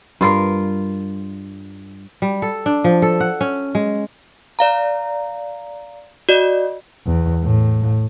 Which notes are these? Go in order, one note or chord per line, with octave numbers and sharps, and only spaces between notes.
G2 F4 A#4
G3
A4
D4
F3
A4
F#5
C#4
G#3
D5 F5 A#5
F#4 D5 D#5
E2
A2